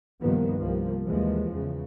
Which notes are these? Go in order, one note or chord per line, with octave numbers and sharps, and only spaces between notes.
C2 G2 D#3 F3 A#3 B3
C2 F3 A#3
D#2 E3 F3 G#3
E2 C#3